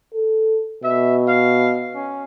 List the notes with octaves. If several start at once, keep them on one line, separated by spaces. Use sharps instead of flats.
A4
B2 E5
F5
C#4